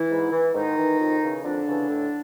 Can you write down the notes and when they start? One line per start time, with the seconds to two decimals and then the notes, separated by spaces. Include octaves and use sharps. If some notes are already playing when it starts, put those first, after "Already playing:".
Already playing: E3 E4
0.10 G#2
0.32 E3
0.55 G#2 D#3 D#4
0.78 E3
0.99 F2
1.21 C#3 E3
1.44 F2 D3 D4
1.67 C#3 E3
1.89 A2